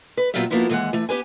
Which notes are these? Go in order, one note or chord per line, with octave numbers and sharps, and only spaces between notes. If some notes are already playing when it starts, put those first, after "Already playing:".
B4
A#2 F#3 B3 F4 G4 E5
F3 A#3 B3 E4 F#4
D#2 E3 G#3 A#4 F#5
E3 A3
B3 G4 B4 G#5